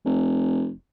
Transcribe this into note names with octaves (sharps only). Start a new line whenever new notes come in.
F1